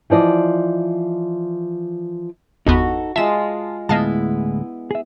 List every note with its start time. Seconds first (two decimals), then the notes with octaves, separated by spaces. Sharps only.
0.10 E3 F3 D5 D#5
2.67 G1 E2 B3 D#4 F#4 A4
3.16 G#3 F4 E5 A5 E7
3.89 D2 A2 G#3 B3 E4 D#5 F5 A5
4.91 G#4 E5